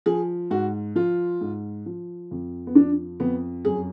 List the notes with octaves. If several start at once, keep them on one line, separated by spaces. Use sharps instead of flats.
F3 G#4
G#2 F#4
F3 F4
G#2
F3
F2
B3
F3 D4
F2 B3
F#2 G#4